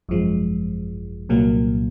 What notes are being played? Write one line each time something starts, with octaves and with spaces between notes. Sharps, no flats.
G#1 F#2 F3 G#3
C2 A#2 F#3 A#3